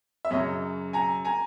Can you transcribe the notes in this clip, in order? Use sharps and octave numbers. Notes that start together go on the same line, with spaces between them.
E5
F#2 C#3 F#3 C#5 D#5
G#5 A#5
G#5 A#5